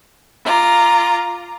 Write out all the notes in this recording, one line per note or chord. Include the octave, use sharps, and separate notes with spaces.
F4 A#5 D6